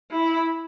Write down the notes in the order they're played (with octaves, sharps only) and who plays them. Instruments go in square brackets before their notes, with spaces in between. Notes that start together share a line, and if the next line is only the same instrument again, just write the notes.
[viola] E4